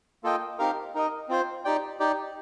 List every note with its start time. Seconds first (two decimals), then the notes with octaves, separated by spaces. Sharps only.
0.24 A#3 F4 A4 D#5 G5
0.59 C4 D#4 G4 A#4 F5
0.94 D#4 A#4 D#5
1.28 C4 F4 C5
1.65 D#4 G4 D5 G5
2.00 D#4 G4 D5 G5